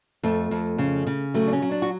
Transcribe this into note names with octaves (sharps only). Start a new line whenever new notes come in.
F2 A3
F2
C#3
C#3
F#3 A3
D4
C#4
F#3
D4
F#4